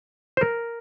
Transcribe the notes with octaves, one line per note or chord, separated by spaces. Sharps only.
C5
A#4